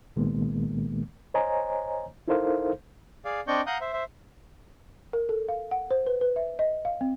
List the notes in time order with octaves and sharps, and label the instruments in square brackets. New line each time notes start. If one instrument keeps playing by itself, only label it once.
[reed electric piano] C2 A#2 D#3 G#3 A#3 B3
C5 C#5 D#5 G#5 A#5
D#4 E4 A4 A#4 C5 F5
[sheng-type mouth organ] G#4 D5 F5
C4 D4 D5 D#5 C#6 G6
F5 F#5 A#5 D#6 F#6 G6
C5 E5
C5 E5
[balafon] A#4
A4
F5
F#5
C5
B4
B4
E5
D#5
F5
C4